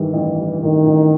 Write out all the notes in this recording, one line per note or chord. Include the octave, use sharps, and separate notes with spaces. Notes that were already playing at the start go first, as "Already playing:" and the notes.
Already playing: G2 D#3 E3 G3
A1
G3
A1 D#3
A1